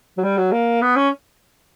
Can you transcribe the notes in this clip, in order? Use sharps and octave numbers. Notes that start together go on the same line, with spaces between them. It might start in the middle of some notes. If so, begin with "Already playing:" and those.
F#3
G3
F#3
A#3
B3
C#4